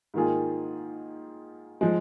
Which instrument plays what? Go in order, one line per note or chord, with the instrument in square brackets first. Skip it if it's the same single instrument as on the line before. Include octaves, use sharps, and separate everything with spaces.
[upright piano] G#2 D#3 A#3 F4 G#4
F3 G#3